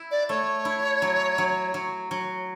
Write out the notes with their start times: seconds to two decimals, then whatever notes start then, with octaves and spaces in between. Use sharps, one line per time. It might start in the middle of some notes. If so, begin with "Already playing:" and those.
Already playing: E4
0.11 D5
0.29 A3 C#5
0.65 E4
1.02 F#3
1.38 F#3
1.74 F#3
2.11 F#3